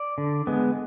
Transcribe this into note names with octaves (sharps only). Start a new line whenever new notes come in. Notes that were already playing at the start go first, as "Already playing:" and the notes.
Already playing: D5
D3
G#3 B3